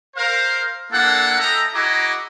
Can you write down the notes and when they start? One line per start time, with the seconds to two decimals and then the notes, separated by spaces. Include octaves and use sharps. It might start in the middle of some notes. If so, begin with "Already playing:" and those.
0.16 A#4 C5 F5
0.92 A#3 D4 E4 A4 F5 F#5
1.38 A4 D#5 E5 G5 A#5
1.74 E4 F#4 G#4 D#5 A#5 D6